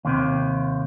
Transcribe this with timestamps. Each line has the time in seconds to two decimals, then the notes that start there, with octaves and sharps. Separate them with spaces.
0.05 D#2 C3